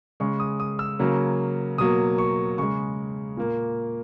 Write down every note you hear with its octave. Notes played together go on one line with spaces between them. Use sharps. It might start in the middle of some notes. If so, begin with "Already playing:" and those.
C#3 G#3 C#6
D#6
D#6
E6
C#3 F#3 A#3
B2 F#3 A#3 D#6
C#6
C#3 G#3 C#6
A#2 A#3